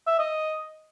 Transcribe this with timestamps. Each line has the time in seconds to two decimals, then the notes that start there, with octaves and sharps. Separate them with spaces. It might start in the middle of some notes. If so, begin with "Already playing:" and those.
0.07 E5
0.19 D#5